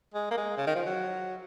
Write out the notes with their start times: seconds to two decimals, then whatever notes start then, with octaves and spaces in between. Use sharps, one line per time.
0.14 G#3
0.31 A#3
0.37 G#3
0.58 C#3
0.67 D#3
0.75 F3
0.86 F#3